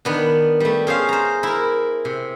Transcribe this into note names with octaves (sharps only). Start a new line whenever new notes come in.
D#3 B3 D4
G3 A3
C#4 G#4 C5 F5
C5 A#5
E4 A#4
C3